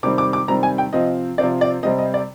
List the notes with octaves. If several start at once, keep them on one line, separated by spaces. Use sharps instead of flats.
C3 D#3 G3 C4 D6
D6
D6
C3 D#3 G3 C4 A#5
G#5
G5
C3 F3 C4 D#5
C3 F3 C4 D5
D5
C3 G3 C4 D#5
D#5
D5